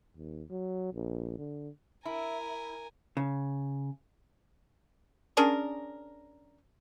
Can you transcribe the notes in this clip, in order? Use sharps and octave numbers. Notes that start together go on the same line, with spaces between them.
D#2
F#3
A#1
D3
E4 A#4 G#5
C#3
C#4 D4 G#4 A#4